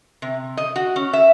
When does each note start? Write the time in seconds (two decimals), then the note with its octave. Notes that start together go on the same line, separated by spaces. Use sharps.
0.22 C3
0.57 D#5
0.76 F#4
0.96 C#4
1.13 E5